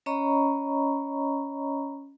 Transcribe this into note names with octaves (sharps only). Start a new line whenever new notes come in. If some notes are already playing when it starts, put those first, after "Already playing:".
C#4 C#5 D#5 A#5 B5 C#6